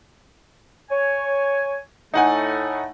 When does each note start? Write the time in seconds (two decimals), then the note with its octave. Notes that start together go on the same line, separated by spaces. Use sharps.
0.91 C#5 G#5
2.14 A2 A3 D#4 F#5 G#5